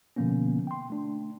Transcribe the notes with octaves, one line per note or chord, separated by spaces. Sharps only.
B2 D3 F3 A#3 B3 C#4
G5 C6
A3 D4